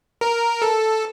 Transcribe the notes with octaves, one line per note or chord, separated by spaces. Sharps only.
A#4
A4